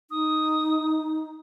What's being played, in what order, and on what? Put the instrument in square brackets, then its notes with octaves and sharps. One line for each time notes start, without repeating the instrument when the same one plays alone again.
[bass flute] D#4 [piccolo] D#6